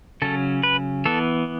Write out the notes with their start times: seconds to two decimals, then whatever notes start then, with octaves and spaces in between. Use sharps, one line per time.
0.22 C#3 F#3 C#4 A4
0.63 B4
1.05 E3 B3 A4